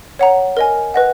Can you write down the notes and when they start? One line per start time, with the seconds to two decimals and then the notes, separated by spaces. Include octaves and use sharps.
0.19 C#5 F#5 A#5
0.57 A#4 D#5 G#5
0.94 B4 D#5 F#5